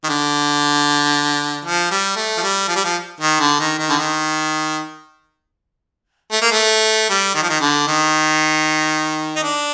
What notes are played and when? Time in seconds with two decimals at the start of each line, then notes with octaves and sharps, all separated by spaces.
0.04 D#3
0.09 D3
1.65 F3
1.91 G3
2.16 A3
2.37 F3
2.42 G3
2.68 F3
2.76 G3
2.84 F3
3.20 D#3
3.40 D3
3.60 D#3
3.78 D#3
3.90 D3
3.99 D#3
6.32 A3
6.42 A#3
6.52 A3
7.09 G3
7.35 D#3
7.43 F3
7.50 D#3
7.61 D3
7.87 D#3
9.36 D#4
9.43 D4